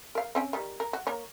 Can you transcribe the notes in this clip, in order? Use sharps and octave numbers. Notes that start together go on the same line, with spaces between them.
A#4 F5
C4 C#4 G5
D#3 G3
A#4
F#4
A#3 A#4 C#5